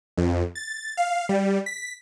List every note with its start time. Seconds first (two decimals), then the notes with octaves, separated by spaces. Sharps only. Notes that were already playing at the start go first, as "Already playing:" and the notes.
0.17 F2
0.55 A6
0.97 F5
1.29 G3
1.66 B6